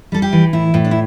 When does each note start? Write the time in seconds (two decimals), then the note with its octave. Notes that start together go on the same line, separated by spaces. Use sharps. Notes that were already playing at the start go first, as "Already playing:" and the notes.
0.12 G3 A4
0.22 G4
0.33 E3
0.53 A2 E4
0.74 A2
0.84 D4
0.91 E4